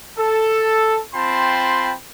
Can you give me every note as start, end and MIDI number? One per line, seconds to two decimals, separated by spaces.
0.19 0.99 69
1.15 1.93 60
1.15 1.93 65
1.15 1.93 79
1.15 1.93 81
1.15 1.93 83
1.15 1.93 84